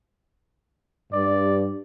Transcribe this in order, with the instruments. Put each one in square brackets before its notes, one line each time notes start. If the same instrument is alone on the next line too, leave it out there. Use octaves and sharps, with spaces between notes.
[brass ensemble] G2 [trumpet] D5